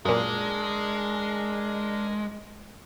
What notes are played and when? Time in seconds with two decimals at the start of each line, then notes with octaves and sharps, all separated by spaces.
0.05 F#2 A#2 G#3 D4 A#4